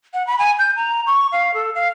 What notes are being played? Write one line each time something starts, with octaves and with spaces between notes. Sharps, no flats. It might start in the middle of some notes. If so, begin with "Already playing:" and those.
F#5
B5
G#5
G6
A#5
C#6
F5
A4
F5